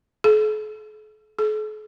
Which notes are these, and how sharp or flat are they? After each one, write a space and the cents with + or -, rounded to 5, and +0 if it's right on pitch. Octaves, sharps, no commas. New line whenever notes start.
A4 -45
A4 -45